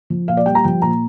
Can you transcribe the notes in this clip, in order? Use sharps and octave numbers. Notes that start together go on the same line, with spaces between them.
F3
A#2 F5
D5
G3 G5
A#5
F3 G5
A#2 A#5